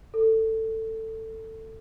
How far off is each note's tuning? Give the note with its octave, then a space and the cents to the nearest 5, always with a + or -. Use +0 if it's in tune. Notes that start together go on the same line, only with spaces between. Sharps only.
A4 +15